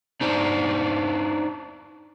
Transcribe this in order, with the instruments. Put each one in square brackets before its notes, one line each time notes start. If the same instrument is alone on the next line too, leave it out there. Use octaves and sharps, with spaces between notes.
[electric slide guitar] D4 D#4 C5